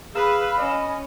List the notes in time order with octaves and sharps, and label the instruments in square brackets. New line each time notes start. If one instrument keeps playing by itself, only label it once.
[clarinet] G#4 [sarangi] B4 [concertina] F5 E6 [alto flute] B5
[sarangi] C#4 [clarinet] D#5